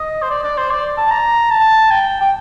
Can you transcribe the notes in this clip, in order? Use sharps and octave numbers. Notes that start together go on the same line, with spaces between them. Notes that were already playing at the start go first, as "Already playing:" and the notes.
Already playing: D#5
C5
D5
D5
C5
D5
A5
A#5
A5
G5
G5